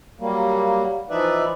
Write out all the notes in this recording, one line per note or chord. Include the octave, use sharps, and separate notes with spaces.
F#3 G3 A#3
E3 F3 D#4 B4 D5 E5